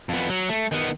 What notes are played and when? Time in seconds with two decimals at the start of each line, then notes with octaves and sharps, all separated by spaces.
0.09 F2 B3
0.30 F#3
0.49 A3
0.72 D#3 B3